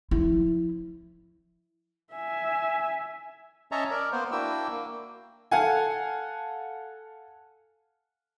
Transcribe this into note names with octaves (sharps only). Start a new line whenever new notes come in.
F3 E4
E5 G#5
C#4 C#5 D#5 E5 A5 A#5
A#4 D5
A#3 B3 C5
A#3 D4 E4 F#4 G5 E6
A#3
A4 F5 F#5 G#5